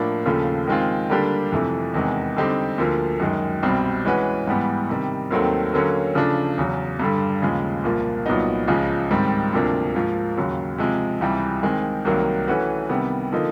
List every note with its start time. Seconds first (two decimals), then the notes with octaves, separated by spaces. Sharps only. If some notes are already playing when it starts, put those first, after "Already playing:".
Already playing: A2 F3 A#3 D4
0.26 D#2 C#3 F3 A3
0.68 D#3 G#3 C4 F4
1.10 D3 G3 A#3 D4 G4
1.52 F2 C3 E3 A3
1.94 E2 C3 D#3 G#3 B3
2.37 D3 G3 C4 D#4 G4
2.78 D2 D3 F3 A#3
3.20 F#2 D#3 G#3
3.63 C2 B2 G3 C4
4.05 E3 G#3 C#4 F#4 B4
4.47 G#2 E3 G3 B3
4.89 C3 D#3 G3
5.31 D#2 D#3 F#3 A3 C4
5.74 D3 F#3 A#3 C#4
6.15 C#3 F3 A3 D4
6.58 E2 C#3 F#3
7.00 G2 D3 G3
7.42 D#2 C#3 F3 G#3
7.84 C2 A#2 F3 A#3
8.26 C2 A#2 F#3 B3 D#4
8.68 C#2 C#3 F3 G#3
9.11 G#2 D#3 G3 C4
9.53 D2 C3 F3 A#3 D4
9.95 G#2 F3 A#3
10.37 D#2 C#3 F#3
10.78 C3 F3 G#3
11.21 C#2 C3 E3 G3
11.63 D#3 G#3 C4
12.05 C2 C3 D#3 F#3 A#3
12.48 E3 A3 C#4 F#4 B4
12.89 C3 D#3 G3 B3
13.32 D3 F3 A#3 D#4